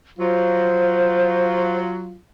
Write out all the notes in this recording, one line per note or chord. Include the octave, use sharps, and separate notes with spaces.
F#3 F4 C5